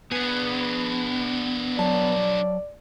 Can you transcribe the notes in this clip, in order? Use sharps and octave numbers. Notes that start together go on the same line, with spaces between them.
B3 D4 G#4
F#3 D5 A5